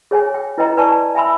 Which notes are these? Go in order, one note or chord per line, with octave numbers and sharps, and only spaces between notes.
G#4 C#5 G5 G#5
G5
E4 B4 D#5 G5 A#5
B4 D5 G#5 A5 C#6
E5 G5 G#5 B5 C6 E6